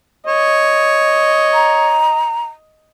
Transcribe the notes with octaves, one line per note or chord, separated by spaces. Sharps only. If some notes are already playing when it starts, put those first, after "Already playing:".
C#5 D#5
A#5